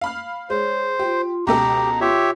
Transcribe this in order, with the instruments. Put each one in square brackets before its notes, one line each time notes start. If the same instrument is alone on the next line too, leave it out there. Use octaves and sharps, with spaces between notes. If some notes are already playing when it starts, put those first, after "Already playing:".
[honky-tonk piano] F5 B5 F6
[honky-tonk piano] G#3 [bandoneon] C5 [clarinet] C#5
[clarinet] F4 [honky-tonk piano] G4
[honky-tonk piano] C#2 B2 A4 [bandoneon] G4 [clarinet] A#5
[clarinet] F4 [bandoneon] G4 C#5 E5